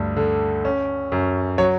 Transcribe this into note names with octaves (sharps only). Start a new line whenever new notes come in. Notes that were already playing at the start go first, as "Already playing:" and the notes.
Already playing: D2 G2
D3
C#4
F#2
F#3 C#5